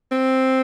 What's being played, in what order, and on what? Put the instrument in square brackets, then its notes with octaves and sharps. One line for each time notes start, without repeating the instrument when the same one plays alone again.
[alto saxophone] C4